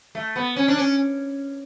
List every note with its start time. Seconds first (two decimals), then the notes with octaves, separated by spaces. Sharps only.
0.15 A3
0.36 B3
0.56 C#4
0.68 D4
0.77 C#4